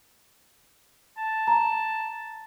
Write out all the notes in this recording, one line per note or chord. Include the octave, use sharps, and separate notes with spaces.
A5
A#5